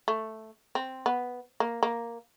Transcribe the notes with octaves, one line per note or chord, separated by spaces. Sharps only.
A3
C4
B3
A#3
A#3